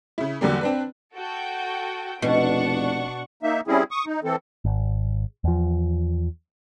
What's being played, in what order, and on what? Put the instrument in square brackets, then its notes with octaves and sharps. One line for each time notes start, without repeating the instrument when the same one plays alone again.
[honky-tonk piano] C#3 E4
E2 D3 F#3 G3 A#3
C4 D4 B4
[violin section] F#4 A4 G5
[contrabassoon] F1 [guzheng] B2 [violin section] D4 F#5 C#6
[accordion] A#3 D#4 E5
G3 C4 C#4 E4 G#4
C#6 D#6
D#4
E3 C4 A4
[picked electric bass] G#1
E2 F3